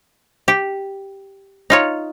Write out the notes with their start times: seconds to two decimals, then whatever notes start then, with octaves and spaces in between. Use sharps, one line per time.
0.48 G4
1.70 D#4 F4 C#5